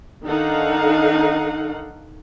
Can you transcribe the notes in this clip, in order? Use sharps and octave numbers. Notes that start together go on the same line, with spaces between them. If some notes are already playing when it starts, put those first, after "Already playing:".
D#3 D4 D#4 A4 F5 F#5